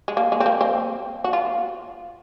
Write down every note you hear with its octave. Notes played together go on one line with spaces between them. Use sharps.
G#3
A#3
G#3
C4
A#3
C4
F#4
F4